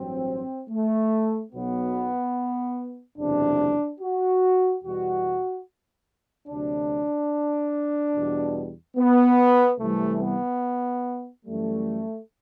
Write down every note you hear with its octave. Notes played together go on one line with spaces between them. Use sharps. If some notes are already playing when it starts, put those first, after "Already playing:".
Already playing: A1 G2 F#3 C4
A3
B1 B2 F#3 B3
F#1 E2 C3 D4
F#4
E2 B2 G3 F#4
D2 C3 F#3 D4
E2 B2 G3
B3
C2 C3 E3 G3 A3
B3
F#2 E3 G3 A3